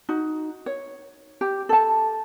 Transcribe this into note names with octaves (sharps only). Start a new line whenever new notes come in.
D#4 F#4
C#5
G4
A4 A5